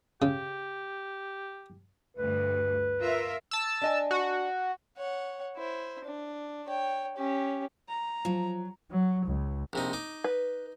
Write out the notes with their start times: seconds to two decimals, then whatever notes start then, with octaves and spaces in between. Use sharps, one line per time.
0.22 C#3 G4
2.17 D2 G2 B4
3.02 F4 A#4 E5
3.51 A5 E6
3.82 D4 D#5 G#5
4.11 F#4
4.97 C#5 F#5
5.56 E4 C5
6.04 D4
6.66 C#5 G5
7.17 C#4 G4
7.88 A#5
8.25 F3 F#3
8.91 F#3
9.26 C#2
9.73 A#1 C3 D#4
9.93 D#4 D6
10.24 B4